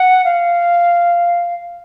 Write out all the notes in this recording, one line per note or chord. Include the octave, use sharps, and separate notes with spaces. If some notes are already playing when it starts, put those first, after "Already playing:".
Already playing: F#5
F5